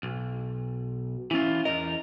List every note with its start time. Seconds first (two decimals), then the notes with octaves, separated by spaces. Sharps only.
0.03 B1
1.31 E3 C#4 E4 F4
1.65 E2 A#4 D#5